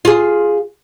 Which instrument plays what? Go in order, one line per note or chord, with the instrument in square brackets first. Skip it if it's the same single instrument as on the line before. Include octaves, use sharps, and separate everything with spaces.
[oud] F4 G#4